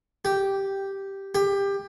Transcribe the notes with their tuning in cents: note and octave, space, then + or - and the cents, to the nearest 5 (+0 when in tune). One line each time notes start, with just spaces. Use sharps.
G4 -5
G4 +20